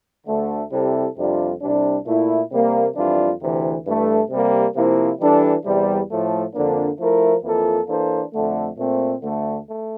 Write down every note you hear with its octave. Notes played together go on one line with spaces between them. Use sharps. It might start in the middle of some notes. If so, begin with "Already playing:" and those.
D2 D3 A3
C3 G3 C4 E4 A4
F2 C3 G3 D4 F4
C2 C3 G3 D4
A#2 A3 E4
C3 G3 A#3
F2 E3 G3 D4 F4
D2 C3 E3
G2 E3 A3
C3 G3 A#3
C3 F3 A#3 E4
E3 G3 D4 A4
E2 C3 G3
A2 F3 A3
F2 D3 F3 A#3 D4
F3 A3 E4 A#4
F2 E3 A#3 F4 A4
E3 A#3 D4 A4 C5
F2 D3 A3
A#2 A3 C4
D2 D3 A3
A3